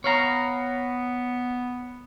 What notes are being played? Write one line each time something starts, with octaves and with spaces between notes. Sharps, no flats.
B3 C#5 F5 A#5